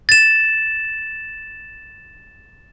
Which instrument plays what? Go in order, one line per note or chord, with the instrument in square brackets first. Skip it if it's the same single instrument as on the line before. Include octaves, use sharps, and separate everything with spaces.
[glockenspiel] A6 E7